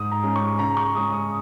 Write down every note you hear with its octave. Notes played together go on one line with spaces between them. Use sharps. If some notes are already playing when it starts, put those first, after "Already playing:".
Already playing: G#2 D#6
A#5
G#3 C#4
C#6
C#3 A#5
C#6
G#3 C#4 D#6
D#6